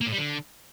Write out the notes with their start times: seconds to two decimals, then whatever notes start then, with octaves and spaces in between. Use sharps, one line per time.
0.01 A#3
0.07 A2
0.12 G3
0.18 D3